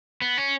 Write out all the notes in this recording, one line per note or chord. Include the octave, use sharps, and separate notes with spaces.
B3
C#4